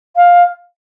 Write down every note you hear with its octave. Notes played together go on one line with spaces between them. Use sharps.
F5